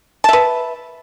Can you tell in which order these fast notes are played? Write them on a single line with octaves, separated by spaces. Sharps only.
A5 E5 B4